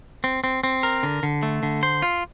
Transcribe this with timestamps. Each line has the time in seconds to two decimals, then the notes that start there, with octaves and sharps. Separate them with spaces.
0.24 C4
0.44 C4
0.64 C4
0.83 A#4
1.03 D3
1.23 D3
1.43 A3
1.63 D3
1.83 C5
2.02 F4